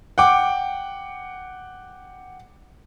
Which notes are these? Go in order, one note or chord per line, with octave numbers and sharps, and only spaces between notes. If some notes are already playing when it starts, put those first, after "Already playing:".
F#5 G5 D6